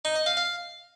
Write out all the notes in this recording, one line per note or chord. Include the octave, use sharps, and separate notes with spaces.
D#4
D#5
F5
F5